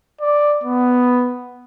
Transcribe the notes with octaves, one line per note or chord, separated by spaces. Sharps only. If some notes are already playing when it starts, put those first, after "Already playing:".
D5
B3